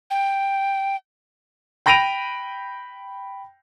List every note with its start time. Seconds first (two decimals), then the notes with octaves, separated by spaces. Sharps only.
0.10 G5
1.86 G5 B5 A#6 D7 D#7 F7